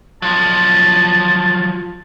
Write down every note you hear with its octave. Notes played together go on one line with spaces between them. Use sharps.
F3 F#3 A5